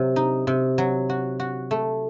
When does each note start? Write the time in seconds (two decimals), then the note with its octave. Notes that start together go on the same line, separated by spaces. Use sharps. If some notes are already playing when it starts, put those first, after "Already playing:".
Already playing: C3 F#3
0.16 D#4
0.47 C3
0.78 F#3
1.10 F#4
1.40 F#4
1.71 A3